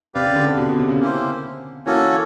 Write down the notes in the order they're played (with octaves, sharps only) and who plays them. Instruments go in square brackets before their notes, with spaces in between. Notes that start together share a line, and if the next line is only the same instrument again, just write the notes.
[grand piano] C3 [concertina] G4 B4 D5 F5
[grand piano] C#3
D3
C3
B2
B2
C3
C#3
[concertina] A#3 C#4 E4 G4 C5
[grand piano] E3 [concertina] A#3 C#4 F#4 A4 C#5